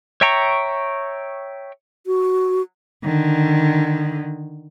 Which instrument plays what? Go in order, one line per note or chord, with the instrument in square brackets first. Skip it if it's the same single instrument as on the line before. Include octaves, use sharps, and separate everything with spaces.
[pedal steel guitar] C#5 E5 G5 A#5 C#6
[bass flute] F#4
[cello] D3 D#3